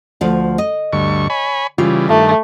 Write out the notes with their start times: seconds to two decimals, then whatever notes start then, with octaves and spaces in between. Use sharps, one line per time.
0.21 D2 F3
0.58 D#5
0.93 D2 G2 C#6
1.30 C#5 G#5 B5
1.78 C#3 E3 G3 F4
2.09 G2 D#3 A3